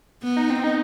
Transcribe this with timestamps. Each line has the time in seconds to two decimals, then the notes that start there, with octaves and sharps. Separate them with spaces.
0.23 B3
0.37 D#4
0.50 C4
0.64 D#4